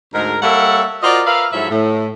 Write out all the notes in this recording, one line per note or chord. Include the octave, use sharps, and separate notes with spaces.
D2 G#2 G#3 A#4
G3 A#3 A4 C#5 E5 F#5
F4 F#4 A#4 C5 D5 D#5
A#4 B4 E5 F5
G#2 F3 F#3 E4 A4 E5
A2